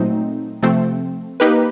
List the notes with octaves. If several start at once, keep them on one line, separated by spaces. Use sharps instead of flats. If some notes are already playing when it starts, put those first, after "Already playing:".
Already playing: A#2 F#3 A3 C4 D#4
C3 F3 A3 C4
A#3 D#4 G4 B4